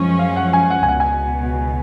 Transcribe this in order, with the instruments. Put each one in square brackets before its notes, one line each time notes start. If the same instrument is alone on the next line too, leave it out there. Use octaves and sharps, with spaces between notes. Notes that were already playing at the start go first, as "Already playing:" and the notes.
Already playing: [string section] F#2 F3 G#3 C#4
[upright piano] F5
F#5
G#5
F#5
G#5
[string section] C#2 B2 [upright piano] F#5
[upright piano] G#5